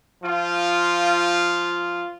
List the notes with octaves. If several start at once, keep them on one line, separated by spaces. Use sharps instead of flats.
F3 F4